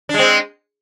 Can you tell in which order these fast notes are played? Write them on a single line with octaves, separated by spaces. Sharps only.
D4 G#3 C4